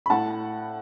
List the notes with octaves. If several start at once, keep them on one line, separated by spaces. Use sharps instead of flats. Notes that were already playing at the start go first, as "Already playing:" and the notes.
B5
A2 F#5 A5